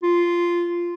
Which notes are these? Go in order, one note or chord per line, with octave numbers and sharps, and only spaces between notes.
F4